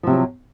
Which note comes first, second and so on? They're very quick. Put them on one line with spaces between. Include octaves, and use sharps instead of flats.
F3 C3 F#3